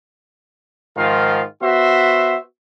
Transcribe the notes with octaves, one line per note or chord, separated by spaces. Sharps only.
G#2 D#3 F3 F4 F5
B3 F#4 C5 E5